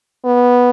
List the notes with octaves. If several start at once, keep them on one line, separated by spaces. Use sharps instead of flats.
B3